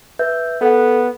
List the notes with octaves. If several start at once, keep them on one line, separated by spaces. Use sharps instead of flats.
B4 E5 G6
B3 A4 F#5